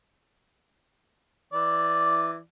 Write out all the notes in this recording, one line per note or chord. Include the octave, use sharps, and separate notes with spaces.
E3 D5